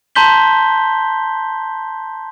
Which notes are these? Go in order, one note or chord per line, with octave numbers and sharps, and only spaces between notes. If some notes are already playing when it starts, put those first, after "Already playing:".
A5 A#5 C6 G6 B6 G7